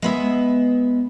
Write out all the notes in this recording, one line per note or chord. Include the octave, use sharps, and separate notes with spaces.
G#3 B3 E5